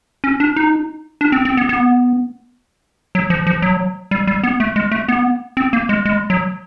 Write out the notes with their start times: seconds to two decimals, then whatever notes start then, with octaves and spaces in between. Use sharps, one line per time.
0.24 C#4
0.40 D4
0.56 D#4
1.21 D4
1.32 C4
1.45 C4
1.57 B3
1.69 B3
3.15 F#3
3.30 F3
3.47 F3
3.62 F#3
4.11 G3
4.27 G3
4.43 B3
4.60 A3
4.76 G#3
4.91 A3
5.08 B3
5.57 C4
5.73 A#3
5.89 G#3
6.05 G#3
6.30 F#3